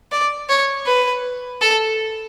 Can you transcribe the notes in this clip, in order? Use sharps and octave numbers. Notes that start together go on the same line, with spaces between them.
D5
C#5
B4
A4